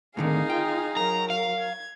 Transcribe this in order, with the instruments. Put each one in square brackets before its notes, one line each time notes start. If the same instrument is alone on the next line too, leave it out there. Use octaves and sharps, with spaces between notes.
[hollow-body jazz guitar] A2 D3 D#3 [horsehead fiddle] C4 A#4 [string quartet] D#4 G#4 F5
[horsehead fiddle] F4 [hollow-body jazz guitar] G5
[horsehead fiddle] F#3 A#4 [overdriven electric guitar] A#5
[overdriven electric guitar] F5
[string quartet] G#6